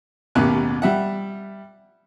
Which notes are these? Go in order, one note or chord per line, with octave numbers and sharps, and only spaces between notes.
A1 D#2 B2 G4 F#6
G3 E5 F#5